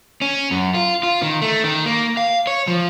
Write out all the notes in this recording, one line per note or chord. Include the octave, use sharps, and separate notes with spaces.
C#4
F#2
F4
F4
D#3
A3
D#3
A#3
F5
C#5
F3